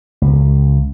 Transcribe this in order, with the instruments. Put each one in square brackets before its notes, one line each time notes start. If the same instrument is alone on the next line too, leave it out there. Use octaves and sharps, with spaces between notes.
[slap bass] C#2